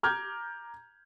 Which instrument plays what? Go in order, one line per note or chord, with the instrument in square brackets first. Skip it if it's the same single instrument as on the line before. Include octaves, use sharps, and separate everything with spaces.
[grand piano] A#5 D6 F6 G6 G#6